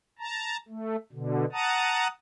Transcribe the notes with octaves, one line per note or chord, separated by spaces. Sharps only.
A5 A#5
A3
B2 D3
F#5 A5 A#5 D#6